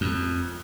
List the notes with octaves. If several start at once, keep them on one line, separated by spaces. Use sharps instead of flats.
F2